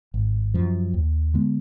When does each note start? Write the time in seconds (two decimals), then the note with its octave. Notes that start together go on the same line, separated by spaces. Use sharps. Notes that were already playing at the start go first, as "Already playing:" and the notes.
0.14 G#1
0.54 F#2 F3
0.94 D#2
1.34 D3 G#3 B3